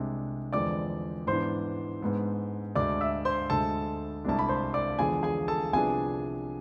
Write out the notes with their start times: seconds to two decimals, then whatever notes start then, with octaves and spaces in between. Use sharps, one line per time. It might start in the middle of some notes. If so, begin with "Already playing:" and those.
Already playing: C2 C3 G#3 D4
0.53 E2 D3 F3 G#3 C4 D5 D6
1.27 G#2 E3 B3 D4 C5 C6
2.01 G#2 G#3 B3 D4
2.75 D2 D3 G#3 D4 D5 D6
3.01 E5 E6
3.25 C5 C6
3.50 D2 D3 G#3 A4 A5
4.25 C2 C3 G#3 D4 A5
4.39 B5
4.49 C5 C6
4.74 D5 D6
4.98 E2 D3 F3 G#3 B3 G#4 G#5
5.23 G#4 G#5
5.48 A4 A5
5.73 C2 C3 F3 B3 D4 G#4 G#5